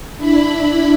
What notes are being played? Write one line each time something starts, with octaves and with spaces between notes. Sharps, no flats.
D4 E4 B5